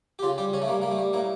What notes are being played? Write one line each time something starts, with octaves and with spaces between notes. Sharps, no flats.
G4
C#3 F4
G3 G4
C#3 C#4
A3
G3 A#3
G3 A#3
A3
G3
A2 A#3